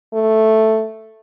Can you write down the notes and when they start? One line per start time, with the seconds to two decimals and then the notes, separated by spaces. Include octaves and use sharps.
0.13 A3